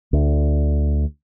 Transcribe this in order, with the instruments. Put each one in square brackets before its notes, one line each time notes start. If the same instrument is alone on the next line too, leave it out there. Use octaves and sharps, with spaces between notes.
[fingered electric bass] D2 D3